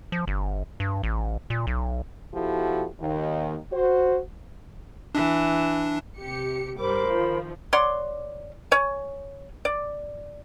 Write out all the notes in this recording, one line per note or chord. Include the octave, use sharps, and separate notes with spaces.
F3
G1
G2
A1
A#2
B1
B2 F3 E4 F#4 G4 A4
D#2 D#3
F#4 C5
E3 D4
C3 G4 C#7
G2 G3 A#4 C5 B5 D6
D#3 F3
C#5 D5 F#5 C6
C#5 G#5
D5